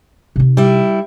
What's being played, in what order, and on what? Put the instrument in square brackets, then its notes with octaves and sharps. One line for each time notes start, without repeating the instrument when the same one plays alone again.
[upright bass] C3 D#4
[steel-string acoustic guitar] G3 E4